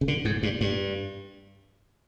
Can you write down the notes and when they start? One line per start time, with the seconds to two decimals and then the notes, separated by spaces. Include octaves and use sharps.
0.01 C#3
0.08 D3
0.25 G#2
0.43 G2
0.61 G2